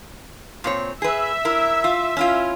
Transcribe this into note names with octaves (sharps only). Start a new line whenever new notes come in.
A#2 C4 C#5
G#4 B4 E5
E4 A#4
F4
C#4 E4 F4